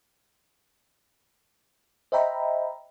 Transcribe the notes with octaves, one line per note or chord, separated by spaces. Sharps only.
C5 D#5 E5 G5 A#5 B5